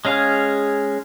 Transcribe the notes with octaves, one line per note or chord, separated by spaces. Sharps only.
G#3 C#4 G#4 F5